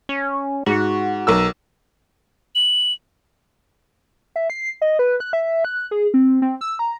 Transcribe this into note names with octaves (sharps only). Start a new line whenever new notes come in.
C#4
G#2 F#4
B1 A#4 E6
F#7
E5
C7
D#5
B4
F#6
E5
F#6
G#4
C4
C4
E6
A#5